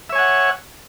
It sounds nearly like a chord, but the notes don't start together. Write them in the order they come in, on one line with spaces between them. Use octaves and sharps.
E5 C#5 G#5 F#5